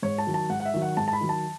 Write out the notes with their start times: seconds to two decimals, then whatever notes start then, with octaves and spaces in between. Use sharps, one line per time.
0.03 G#2 C#5
0.18 A5
0.27 D#3 F#3
0.34 A5
0.50 G#2 F#5
0.60 F#5
0.65 E5
0.74 D#3 F#3
0.82 F#5
0.97 G#2 A5
1.08 A5
1.13 B5
1.21 D#3 F#3
1.29 A5